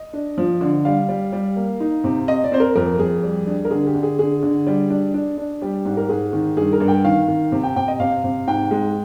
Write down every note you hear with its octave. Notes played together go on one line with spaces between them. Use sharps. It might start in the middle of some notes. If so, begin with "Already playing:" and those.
Already playing: D#5
D4
F3
D3
G3 F5
G3
G3
A#3
D#4
C3
C4 D#5
D5
C4 C5
A#4
F2 A#4
F2 G#4
G3
D4
A#4
D3 G#4
G4
D3
G#4
D3 G#4
D3
G3
D4
D4
D4
G3 G4
G#2
A#4
G#2 G#4
D#3
G2 G#4
A#4
G2
G5
D#3 F5
D#3
C3
G5
C3 G5
D#5
C3 F5
C3
G#2 G5
G#3